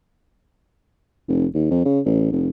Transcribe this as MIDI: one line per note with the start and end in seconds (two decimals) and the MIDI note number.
1.28 1.46 29
1.54 1.66 39
1.71 1.82 41
1.85 2.00 49
2.05 2.31 33
2.32 2.49 29